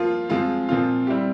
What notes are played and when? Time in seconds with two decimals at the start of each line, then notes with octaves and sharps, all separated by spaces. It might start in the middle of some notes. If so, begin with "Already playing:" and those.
Already playing: F3 A#3 F4
0.30 F3 G#3 C4 F4
0.69 A#2 F3 C4 F4
1.07 G3 C4 E4 G4